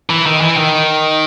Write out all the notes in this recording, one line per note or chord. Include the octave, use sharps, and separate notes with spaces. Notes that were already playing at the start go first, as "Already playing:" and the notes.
E3
D#3
E3
D#3